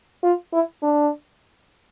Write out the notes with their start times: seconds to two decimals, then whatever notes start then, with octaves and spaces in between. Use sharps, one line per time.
0.23 F4
0.53 E4
0.82 D4